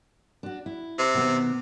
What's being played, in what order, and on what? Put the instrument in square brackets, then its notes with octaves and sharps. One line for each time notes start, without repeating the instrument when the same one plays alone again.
[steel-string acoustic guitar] D4 F#4
E4
[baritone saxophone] C3
[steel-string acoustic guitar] B2 D#3 B3